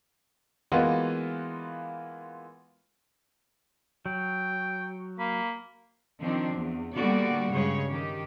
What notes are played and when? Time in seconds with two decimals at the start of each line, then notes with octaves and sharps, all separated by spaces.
0.72 E3 G#3 A#3 B3 F4 F#4
4.06 F#3 G5
5.19 A#3 B5
6.20 D#3 F3 C4 D4
6.55 E2
6.94 D3 G3 A#3 B3 F#4 D5
7.52 G2 C#3 G#3 C#5
7.89 D#3 G4